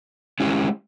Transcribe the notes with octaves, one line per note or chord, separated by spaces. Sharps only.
G#3 C#4 E4 G4